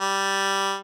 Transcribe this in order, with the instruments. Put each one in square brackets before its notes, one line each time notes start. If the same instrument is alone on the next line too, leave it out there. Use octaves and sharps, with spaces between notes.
[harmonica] G3